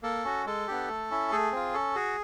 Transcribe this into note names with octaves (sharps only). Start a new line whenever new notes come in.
A#3 A4
C#4 F#4
G#3 A4
B3 D4 G4
A3
C#4 E4
A3 G#4
C4 F4
C#4 A4
F#4 G#4